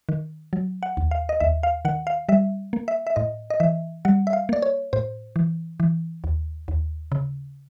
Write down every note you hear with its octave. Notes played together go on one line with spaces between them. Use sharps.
D#3
F#3
F#5
D#2
F5
D#5
D#2 E5
F5
D#3 F#5
F5
G3 E5
A#3
E5
E5
A2 D#5
D#5
E3 E5
G3 F#5
E5
F5
A#3 D5
C#5
A2 C5
E3
E3
D#2
D#2
C#3